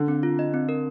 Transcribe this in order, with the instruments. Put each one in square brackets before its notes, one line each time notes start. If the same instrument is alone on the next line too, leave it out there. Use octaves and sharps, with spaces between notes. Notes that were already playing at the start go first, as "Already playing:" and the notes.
Already playing: [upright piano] D3
[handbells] C4
F4
D#5
C4
A#4